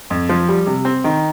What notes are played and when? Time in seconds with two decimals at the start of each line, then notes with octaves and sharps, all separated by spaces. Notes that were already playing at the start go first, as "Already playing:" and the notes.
0.10 F2
0.29 F3
0.48 G3
0.66 C3
0.85 C4
1.04 D#3